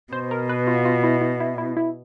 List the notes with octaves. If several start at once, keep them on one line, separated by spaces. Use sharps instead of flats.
B2 C5
A#4
B4
F4
F4
E4
E4
E4
E4
E4